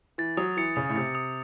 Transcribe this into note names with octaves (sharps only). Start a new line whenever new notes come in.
E3 A6
F#3 D#6
E3 C#7
C#3 D#6
A2
C3 A6
D#6